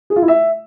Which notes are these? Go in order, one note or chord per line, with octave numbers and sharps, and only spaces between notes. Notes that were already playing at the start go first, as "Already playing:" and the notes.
G#4
F4
E4
E5